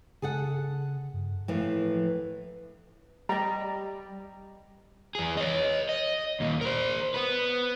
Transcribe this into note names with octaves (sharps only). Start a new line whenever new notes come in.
C#3 G#4 A4 F#5
G2
A2 E3 F3 A#3
G3 D#5 A#5
E2 G#4
C#5 D#5
D#5
D#2 A#2
A#4 C5
B3 B4